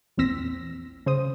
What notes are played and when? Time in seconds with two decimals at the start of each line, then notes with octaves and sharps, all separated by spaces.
0.17 A#1 E2 C4 E6 A#6 B6
1.06 C#3 C5 D#6